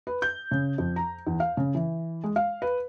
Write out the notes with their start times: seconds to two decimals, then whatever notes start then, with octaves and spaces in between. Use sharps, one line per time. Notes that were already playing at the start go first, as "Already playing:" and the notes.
0.07 B4
0.22 G6
0.51 C#3
0.78 F2
0.96 A#5
1.27 E2
1.40 F5
1.57 C#3
1.75 E3
2.24 G#3
2.36 F5
2.62 B4